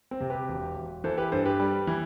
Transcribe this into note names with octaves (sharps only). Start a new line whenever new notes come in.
C4
C3
G4 B4
E1
E1
E3 A4 C5
G4 B4
G2 A4 C5
G4 B4
G3
E3